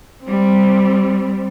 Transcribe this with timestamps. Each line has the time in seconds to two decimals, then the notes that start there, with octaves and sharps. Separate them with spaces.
0.23 G3 C4